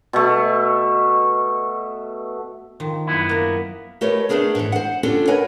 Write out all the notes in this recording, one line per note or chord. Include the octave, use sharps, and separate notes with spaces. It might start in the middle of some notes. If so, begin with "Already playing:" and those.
B2 A3
D#3 F3
F#2 B3 E4
A#3 A#4
A3 G4 A#4 B4 C#5 D#5
A3 B3 D4 G#4 A#4
G#2 E3
C5 F#5
C#4 D4 F4 G4 A4
A#4 B4 C#5 D#5 F#5 G#5